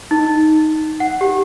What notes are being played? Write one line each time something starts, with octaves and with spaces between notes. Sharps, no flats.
D#4
F#5
G4